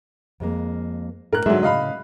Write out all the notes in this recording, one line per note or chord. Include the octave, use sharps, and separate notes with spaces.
F2 G#3 A#3
A2 A#4 F#6
G#2 D3 F#3 G#3 G#4 E5
A2 C#3 D#5 F5 B5